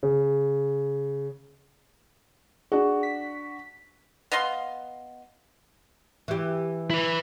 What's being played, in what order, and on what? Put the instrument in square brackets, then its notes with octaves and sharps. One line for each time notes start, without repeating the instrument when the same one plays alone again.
[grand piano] C#3
[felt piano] D4 F#4 [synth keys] G#4
[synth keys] B6
[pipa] B3 D#5 F5 C6
[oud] E3 G4
[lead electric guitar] E4 B4